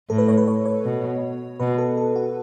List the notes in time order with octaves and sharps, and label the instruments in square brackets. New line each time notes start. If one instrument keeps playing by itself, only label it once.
[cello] A2 [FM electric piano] A4
[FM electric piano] B4
C#5
B4
C#5
C#5
[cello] B2
[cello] B2 [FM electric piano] B4
[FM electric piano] A4
A4
F#4